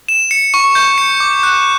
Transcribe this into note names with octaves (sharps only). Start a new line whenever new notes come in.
E7
C#7
C#6
G6
C#7
D6
F#6